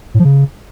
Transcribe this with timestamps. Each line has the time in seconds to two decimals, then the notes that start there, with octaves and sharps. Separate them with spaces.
0.14 A2
0.20 F3
0.25 C#3